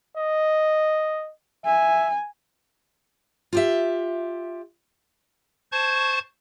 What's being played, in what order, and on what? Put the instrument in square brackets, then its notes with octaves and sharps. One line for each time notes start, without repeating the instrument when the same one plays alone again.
[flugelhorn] D#5
[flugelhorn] E5 [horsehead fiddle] G#5
[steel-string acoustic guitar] F4 G4 E5
[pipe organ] C5 A5 C#6 G#6